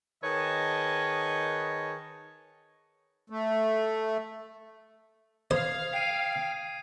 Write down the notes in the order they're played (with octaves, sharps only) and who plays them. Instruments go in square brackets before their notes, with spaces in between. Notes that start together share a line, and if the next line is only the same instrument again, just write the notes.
[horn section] D#3 G#4 B4 C#5 D#5 A5
[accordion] A3
[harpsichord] C5 [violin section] F5 [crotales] D#6 G#6
[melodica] G5 [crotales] C7 D7 D#7